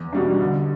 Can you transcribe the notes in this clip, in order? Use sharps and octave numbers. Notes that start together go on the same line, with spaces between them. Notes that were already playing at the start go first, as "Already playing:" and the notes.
Already playing: E2
B2 G3 D4
D3